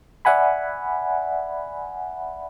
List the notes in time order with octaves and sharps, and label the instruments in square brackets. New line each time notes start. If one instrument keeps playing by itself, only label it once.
[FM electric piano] D5 E5 F#5 G#5 B5